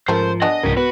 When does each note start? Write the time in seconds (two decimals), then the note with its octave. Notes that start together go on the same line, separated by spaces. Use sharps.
0.08 G#2 C#3 F3 A3 A#4 C5
0.42 B3 D4 G#4 D#5
0.63 C2 G#2 C#3 F3 G4 A#4
0.77 B3 F#4 B4